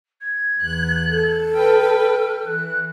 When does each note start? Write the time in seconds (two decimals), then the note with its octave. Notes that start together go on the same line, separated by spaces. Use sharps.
0.21 G#6
0.60 E2 F#6
1.09 A4
1.54 B4 G5 F6
2.46 E3 F#6